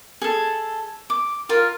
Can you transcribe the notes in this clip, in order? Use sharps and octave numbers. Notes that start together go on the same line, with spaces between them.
G#4 A4
D6
F4 A#4 F5